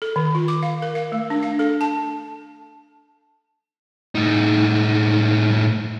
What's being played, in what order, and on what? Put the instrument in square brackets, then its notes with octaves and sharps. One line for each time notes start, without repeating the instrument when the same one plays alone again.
[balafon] A4
D#3
F4
D6
F5
A#4
F5
A3
D4
F5
A4
A5
[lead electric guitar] A2 D#4